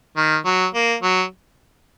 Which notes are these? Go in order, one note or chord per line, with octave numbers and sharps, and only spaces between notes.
D#3
F#3
A#3
F#3